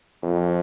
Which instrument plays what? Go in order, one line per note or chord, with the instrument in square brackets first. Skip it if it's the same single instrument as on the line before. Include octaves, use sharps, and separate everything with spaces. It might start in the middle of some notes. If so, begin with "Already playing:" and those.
[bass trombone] F2